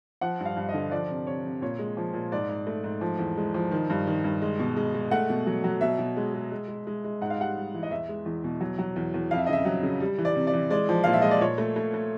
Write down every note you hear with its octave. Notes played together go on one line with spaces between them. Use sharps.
F3 F#5
G2
F5
G2
D#5
D3
F3 D5
C3
C3 C#5
C3
A#2 C#5
G#3
F3
A#2
G#2 D5
G#2
A3
G#2
F3
E2
G#3
F3
D#3
G2
D#3
G2
G#3
B2
G#3
G#3
A3 F#5
B2
F#3
F#3
B2 E5
B2
G#3
G#3
G#3
G#3
G#3
G#3
G#2 F#5
F5
G3 F#5
G3
E3
D#5
E2 E5
G#3
E2
B2
F#3
F#3
E2
E2
F2 F5
E5
D#5
C#3 E5
F#3
C#3
G3
E3
D5
C3
D5
E3
G#3 D5
F3
A#2 F5
E5
G#3 D#5
D5
A#2 C#5
A3
A3
A3